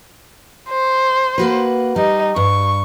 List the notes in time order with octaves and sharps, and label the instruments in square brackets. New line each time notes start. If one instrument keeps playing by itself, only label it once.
[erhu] C5
[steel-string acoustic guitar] A#3 F#4 B4
[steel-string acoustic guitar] G3 [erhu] D#4
[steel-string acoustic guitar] G2 [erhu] C#6